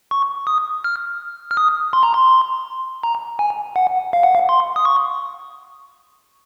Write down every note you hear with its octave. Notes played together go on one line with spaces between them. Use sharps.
C#6
D#6
F6
F6
D#6
C6
A#5
C6
A#5
G#5
F#5
F5
F#5
F5
C6
D#6
C#6